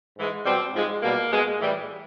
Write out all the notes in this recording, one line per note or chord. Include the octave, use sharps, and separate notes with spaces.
G#2 E3 G#3
B2 G3 C4
G#2 F3 G#3
B2 G3 A#3
B2 G#3
A2 E3 G3